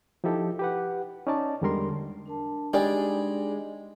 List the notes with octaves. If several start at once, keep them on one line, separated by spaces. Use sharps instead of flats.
F3 D#4 E4 G4 A4
G4 B4 F#5
C#4 D#4 D5 A5
E2 D3 G3 G#3 A#4 C6
D4 A#4 A5
G3 G#3 D4 D#4 G4 G#4 D5